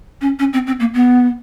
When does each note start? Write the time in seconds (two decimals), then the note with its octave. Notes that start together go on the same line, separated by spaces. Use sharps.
0.21 C#4
0.39 C#4
0.53 C4
0.67 C4
0.79 A#3
0.93 B3